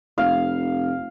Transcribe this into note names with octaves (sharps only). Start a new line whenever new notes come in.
F1 F5